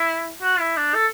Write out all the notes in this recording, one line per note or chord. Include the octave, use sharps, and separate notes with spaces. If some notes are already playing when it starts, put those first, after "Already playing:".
Already playing: E4
F#4
E4
D4
A4